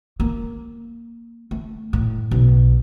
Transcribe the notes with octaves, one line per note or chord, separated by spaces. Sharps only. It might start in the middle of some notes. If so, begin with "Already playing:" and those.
A#3
A3
A2
B1